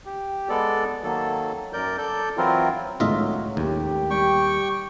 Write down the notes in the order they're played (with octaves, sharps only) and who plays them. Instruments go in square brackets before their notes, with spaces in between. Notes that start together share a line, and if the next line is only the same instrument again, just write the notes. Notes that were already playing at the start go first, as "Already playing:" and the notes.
[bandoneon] G4
G#3 B3 A4 D5
D#3 F#3 A#3 A4
F#2 A#4 D5 G6
A4 D5 G6
E3 F#3 C4 E4 F4 A#4
[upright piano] C#2 A2 D#3 [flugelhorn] F#3 [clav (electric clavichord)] F4 D#5 E5
[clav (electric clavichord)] D#2 [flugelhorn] G4
[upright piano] G3 [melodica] G5 C#6